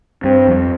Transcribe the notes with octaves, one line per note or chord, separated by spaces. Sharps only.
G2 C4
F2